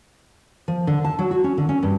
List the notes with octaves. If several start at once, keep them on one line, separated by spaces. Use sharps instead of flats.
F3
D3
A5
F#3
F#4
C#4
D3
C#4
G2